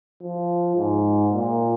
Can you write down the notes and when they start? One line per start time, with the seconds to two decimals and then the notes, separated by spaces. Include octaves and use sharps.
0.22 F3
0.77 G#2
1.33 A#2